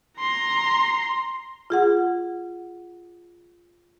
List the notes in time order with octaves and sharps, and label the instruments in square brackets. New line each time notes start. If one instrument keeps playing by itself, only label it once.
[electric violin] A#5 C6
[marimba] F4 G#4 F#5